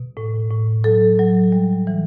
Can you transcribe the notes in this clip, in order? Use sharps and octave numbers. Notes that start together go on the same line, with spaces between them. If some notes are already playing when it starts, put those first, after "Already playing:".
Already playing: B2
A2
A2
F#3 A4
F#3
G3
E3